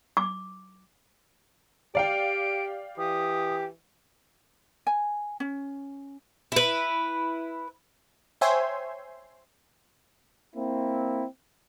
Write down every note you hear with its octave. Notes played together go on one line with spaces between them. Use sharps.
D6
G4 D5 F5 G5 D7
E3 G4 D#6
G#5
C#4
E4 B4
C5 C#5 E5 G5 G#5 C6
A#3 C4 E4